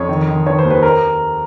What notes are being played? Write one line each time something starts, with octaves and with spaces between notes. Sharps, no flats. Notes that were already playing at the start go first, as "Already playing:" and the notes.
Already playing: F2 C#5
D#3
D#3
D#3 C#5
C5
D#2
B4
A#4